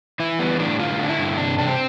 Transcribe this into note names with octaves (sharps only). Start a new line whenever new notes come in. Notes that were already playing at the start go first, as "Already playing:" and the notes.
E3 E4
G3 B3
A2 D4
D3 F4
D3 D4
E4
G2
C3 D4
C3 D4
C4